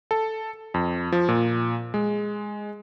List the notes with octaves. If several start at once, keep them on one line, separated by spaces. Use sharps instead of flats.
A4
F2
F3
A#2
G#3